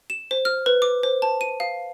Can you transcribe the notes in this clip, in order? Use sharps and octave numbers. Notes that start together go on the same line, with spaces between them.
E7
C5
F6
B4
D6
C5
A5
D#7
F5